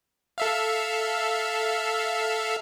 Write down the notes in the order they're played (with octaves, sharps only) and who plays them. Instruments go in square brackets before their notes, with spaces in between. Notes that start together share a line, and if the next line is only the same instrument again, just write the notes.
[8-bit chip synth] A4 E5 F5